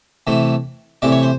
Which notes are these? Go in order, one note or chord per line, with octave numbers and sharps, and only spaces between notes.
C3 E3 A3
C3 E3 A3 D5
C#5
C5